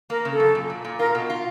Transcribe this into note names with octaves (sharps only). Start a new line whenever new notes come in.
A#3 A#4
C#3
A4
F#2
A#2
A#2
A#2
F4 A#4
B2
F4